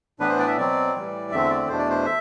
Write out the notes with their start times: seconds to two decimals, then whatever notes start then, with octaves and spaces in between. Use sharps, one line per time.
0.20 A2 E3 B3 D4 B4
0.29 C5
0.39 D5
0.47 E5
0.58 B2 F#3 C4 D5
0.94 A2 E3 G3
1.31 E2 D3 A3 C4 E5
1.50 D5
1.68 E2 B2 A3 D4 C5
1.78 D5
1.90 C5
2.05 E5